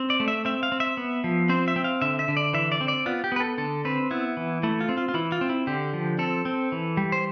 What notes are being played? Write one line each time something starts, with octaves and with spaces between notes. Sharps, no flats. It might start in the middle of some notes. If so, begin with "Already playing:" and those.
Already playing: C4
D5
A3
E5
C4 E5
F5
C4
E5
B3
F3
C4 C5
E5
C4
F5
D3 E5
E5
D3
D5
E3 E5
D5
C4
D5
B3 F4
G4
B3 B4
A4
D3 A4
C4 B4
B3 E4
E3
A3 E4
F4
C4
F4
F4
E3 E4
F4
C4
E4
D3 G4
F3
C4 A4
C4
E3
G3
C5